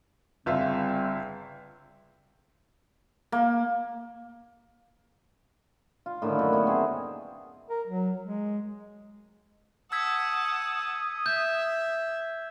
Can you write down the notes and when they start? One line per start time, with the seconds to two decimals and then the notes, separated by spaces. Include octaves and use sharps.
0.46 G1 C#3 G3 C4 F4 E5
3.32 A#3
6.06 F4
6.22 A2 D3 D#3 A#3
6.36 F#2 F#5
6.52 B3 E4 F#4
6.66 B3 C4 G#4
7.69 A#4
7.88 F#3
8.23 G#3
9.92 F#5 A5 D#6 E6 G#6 B6
11.26 E5 G6